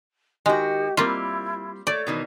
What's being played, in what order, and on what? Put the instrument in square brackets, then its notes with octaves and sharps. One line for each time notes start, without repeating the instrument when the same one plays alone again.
[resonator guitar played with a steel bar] D#3 F#4 [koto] G#3 [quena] G4
[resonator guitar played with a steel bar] G3 C4 [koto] A#3 F4 [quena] E4
[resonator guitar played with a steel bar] A3 [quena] C#5 [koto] D5
[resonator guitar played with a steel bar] B2 D#3 E3